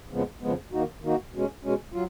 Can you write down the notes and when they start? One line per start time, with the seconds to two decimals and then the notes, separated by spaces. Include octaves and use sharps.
0.11 F2 C#3 F3 G#3 B3
0.42 F2 C#3 F3 G#3 B3
0.72 D#3 A#3 D#4 F#4
1.02 D#3 A#3 D#4 F#4
1.33 B2 G#3 C#4
1.63 B2 G#3 C#4
1.93 F#3 F4